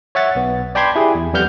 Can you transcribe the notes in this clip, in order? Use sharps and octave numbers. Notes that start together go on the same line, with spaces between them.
C#5 E5 F#5 A6
B1 B3
D5 G5 A5 B5 C6 G#6
E4 G4 G#4
E2
F2 G3 B3 F#5 F6 G6